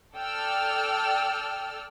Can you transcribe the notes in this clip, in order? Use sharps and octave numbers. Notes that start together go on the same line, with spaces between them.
A4 D5 G5 A5 E6 F6